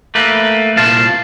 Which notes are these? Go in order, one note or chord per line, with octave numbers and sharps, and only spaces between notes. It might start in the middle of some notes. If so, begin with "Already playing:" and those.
A3 A#3 B4
C2 A#2 F5 A5